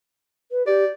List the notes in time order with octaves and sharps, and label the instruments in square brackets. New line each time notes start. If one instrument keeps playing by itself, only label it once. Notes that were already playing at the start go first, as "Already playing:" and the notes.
[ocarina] B4
[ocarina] G4 [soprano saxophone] D5